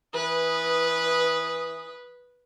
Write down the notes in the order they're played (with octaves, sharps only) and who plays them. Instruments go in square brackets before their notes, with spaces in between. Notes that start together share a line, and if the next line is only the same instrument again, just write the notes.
[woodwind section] E3 D#6 [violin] B4